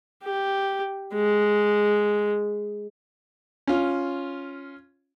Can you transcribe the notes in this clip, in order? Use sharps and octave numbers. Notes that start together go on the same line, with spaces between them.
G4
G#3
C#4 F4